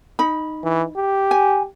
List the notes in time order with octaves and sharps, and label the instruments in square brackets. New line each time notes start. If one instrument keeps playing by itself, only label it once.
[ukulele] D#4 B5
[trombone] E3
G4
[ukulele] G#5